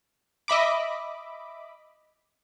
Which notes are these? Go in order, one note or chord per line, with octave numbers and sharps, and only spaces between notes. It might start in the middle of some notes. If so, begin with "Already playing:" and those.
D#5 E5 B5 D6